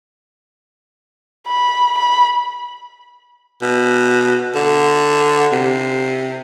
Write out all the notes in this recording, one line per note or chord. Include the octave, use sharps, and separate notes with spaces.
B5
B5
B2
D3
C3